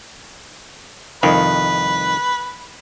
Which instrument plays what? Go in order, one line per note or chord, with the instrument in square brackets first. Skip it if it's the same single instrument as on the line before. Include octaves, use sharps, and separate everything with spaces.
[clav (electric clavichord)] C2 F2 D#3 [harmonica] B4